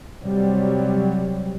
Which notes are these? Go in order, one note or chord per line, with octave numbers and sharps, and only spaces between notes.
C3 F#3 G3